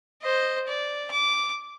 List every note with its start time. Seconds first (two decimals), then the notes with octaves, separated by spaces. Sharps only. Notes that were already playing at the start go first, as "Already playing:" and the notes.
0.22 C5 D#5
0.67 D5
1.10 D6